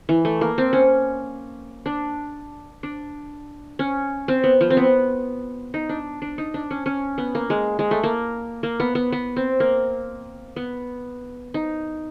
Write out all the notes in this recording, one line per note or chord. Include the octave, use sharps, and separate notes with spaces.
E3
A3
A#3
C4
C#4
D4
D4
C#4
C4
B3
F3
C4
B3
D#4
D4
D4
D#4
D4
C#4
C#4
B3
A#3
G#3
G#3
A3
A#3
A#3
B3
B3
B3
C4
A#3
B3
D#4